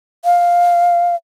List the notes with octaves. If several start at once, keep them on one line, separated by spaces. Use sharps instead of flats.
F5